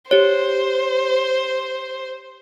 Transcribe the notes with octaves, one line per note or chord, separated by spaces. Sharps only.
G4 C5 C#5